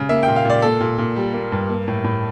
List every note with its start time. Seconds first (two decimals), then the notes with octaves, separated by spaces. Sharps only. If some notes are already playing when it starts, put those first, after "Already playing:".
Already playing: C#3
0.09 A#3 E5
0.23 A#2 G5
0.36 F5
0.45 A#2 D5
0.62 A#3 A4
0.81 A#2
0.98 A#2
1.16 G3
1.34 A#3
1.52 G2
1.69 A#3
1.88 A2
2.04 A2